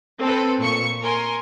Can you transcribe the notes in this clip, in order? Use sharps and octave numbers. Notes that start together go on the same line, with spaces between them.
C4 A4 B4
A#2 C#6 C#7
A#4 G#5 C6